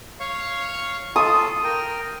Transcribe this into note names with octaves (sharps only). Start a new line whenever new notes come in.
C#5 F5 C#6
F4 A4 D#6
A#4 G5